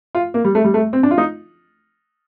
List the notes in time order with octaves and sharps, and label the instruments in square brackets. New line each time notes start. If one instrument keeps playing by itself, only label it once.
[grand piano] F4
A#3
G3
A3
G3
A3
C4
D4
F4
D#4